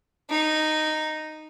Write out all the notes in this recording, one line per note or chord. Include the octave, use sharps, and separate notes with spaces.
D#4